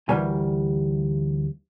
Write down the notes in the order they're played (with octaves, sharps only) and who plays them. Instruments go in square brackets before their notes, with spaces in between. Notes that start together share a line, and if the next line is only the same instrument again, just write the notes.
[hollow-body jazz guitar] D2 E3 G3 A#4 G#5